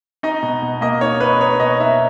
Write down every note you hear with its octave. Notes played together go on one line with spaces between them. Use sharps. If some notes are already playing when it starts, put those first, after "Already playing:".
D#4 D#5
B2
B2
A#3 D#5
D#4 C#5
D#4 B4
D#4 C#5
B2 D#5
D#4 E5